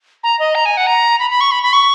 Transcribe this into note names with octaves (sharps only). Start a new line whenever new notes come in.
A#5
D#5
A#5
G#5
F#5
A#5
B5
B5
C#6
B5
B5
C#6